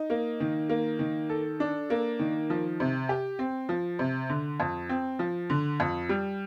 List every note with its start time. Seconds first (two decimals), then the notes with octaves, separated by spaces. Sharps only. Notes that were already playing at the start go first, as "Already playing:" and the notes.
Already playing: D#4
0.10 A#3
0.40 D#3
0.69 A#3
0.99 D#3
1.29 A4
1.60 D4
1.90 A#3
2.19 D#3
2.50 F3
2.80 C3
3.09 G4
3.39 C4
3.69 F3
3.99 C3
4.29 D3
4.60 F2
4.89 C4
5.19 F3
5.50 D3
5.80 F2
6.09 G3